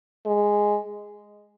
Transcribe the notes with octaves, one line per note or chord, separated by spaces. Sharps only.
G#3